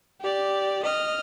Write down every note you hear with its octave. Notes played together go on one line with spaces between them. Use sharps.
G4 D5
D#5 F6